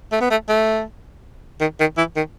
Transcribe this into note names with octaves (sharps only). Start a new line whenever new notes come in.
A3
B3
A3
A3
D#3
D#3
E3
D#3